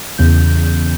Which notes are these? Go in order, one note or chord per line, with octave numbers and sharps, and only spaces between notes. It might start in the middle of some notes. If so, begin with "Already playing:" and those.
E2 C#3 G6